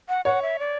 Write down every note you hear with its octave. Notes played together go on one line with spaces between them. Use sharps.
F#5
C#5 F#5
E5
D5